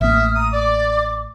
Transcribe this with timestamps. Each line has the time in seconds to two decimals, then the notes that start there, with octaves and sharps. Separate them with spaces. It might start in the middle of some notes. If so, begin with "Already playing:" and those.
0.01 A1 A#3 E5 D#6 F6
0.35 A#5 D#6
0.52 D5 D6